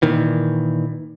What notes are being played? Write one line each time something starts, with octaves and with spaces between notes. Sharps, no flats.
A#2 D#3 E3